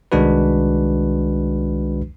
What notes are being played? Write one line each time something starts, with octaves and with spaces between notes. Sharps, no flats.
C2 D#3 G#3 D4 F#4 B4